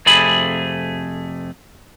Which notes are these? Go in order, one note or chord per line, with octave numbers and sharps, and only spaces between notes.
F2 C3 A3 G#4 B5